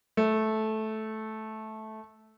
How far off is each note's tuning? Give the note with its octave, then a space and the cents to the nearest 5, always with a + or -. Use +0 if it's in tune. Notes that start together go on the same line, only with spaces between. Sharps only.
A3 -10